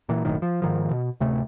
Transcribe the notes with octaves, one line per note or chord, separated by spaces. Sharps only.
A#2 E3
F#1 B1 A2 D#3
F3
G#2 D#3 F3
B2
D1 C3 A3